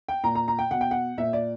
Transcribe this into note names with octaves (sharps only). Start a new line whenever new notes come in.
G5
A#2 A#5
A#5
A#5
G5
B2 F#5
G5
F#5
A#2 E5
D5